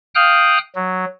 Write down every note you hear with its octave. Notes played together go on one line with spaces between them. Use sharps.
F5 G5 D#6 F6 F#6
F#3